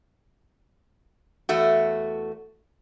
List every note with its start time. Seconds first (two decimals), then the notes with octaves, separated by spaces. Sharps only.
1.49 E2 A3 F#4